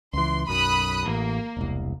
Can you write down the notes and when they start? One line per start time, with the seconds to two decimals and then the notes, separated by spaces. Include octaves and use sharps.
0.13 C#2 E3 C6
0.48 B1 F#2 B5 D#6 F#6
1.06 A1 A#3
1.57 E1 C2